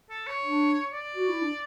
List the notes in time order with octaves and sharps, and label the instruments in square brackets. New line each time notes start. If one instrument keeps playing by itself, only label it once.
[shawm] A4
C#5
[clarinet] D4
[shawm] D5
[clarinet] F#4
E4
D4